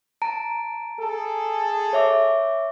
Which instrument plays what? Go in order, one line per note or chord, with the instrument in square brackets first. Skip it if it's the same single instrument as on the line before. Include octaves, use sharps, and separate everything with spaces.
[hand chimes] A5 A#5 D7
[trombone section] G#4 A4
[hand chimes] C#5 E5 D6